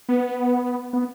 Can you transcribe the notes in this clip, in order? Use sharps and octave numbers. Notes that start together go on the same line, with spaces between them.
B3
B3